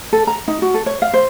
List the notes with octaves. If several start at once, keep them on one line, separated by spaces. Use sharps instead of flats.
A4
A#5
D#4
F#4
A4
C#5
F5
C5